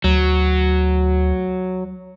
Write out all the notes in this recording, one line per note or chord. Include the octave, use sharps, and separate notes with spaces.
D2 F#3